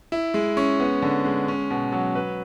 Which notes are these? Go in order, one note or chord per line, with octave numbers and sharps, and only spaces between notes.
E4
G#3
C#4
B3
D3
G#3
C#4
B2
F#3
B4